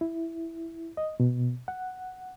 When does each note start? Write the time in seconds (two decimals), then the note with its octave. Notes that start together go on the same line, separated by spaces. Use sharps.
0.01 E4
0.97 D#5
1.20 B2
1.68 F#5